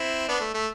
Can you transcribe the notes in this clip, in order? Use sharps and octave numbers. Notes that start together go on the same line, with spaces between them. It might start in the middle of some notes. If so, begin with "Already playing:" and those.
Already playing: C4 E4
B3 D4
A3
A3